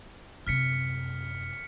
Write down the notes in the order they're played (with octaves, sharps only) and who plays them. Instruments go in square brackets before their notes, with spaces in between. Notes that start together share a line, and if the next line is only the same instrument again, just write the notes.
[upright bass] F#2 C3 [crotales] F6 B6 C#7